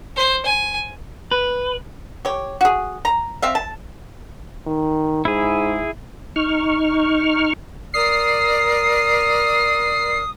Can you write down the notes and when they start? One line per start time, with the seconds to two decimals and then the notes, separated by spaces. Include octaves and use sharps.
0.16 C5
0.45 G#5
1.31 B4
2.25 G4 C#5
2.61 F#4 G#4
3.05 A#5
3.42 C4 E5 F5
3.55 A5
4.67 D#3
5.25 G#2 E4 G#4
6.36 D#4 C#6 F6
7.94 A#4 D5 D#6 F6 C7